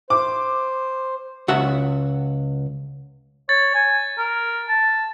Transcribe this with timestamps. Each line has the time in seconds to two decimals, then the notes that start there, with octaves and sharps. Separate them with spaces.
0.10 C5 D6
1.48 C#2 F#4 E5 F#5
3.49 C#5 A6
3.75 G#5
4.18 A#4
4.69 A5